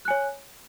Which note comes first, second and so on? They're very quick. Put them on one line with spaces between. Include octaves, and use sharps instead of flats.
F#6 G#5 C#5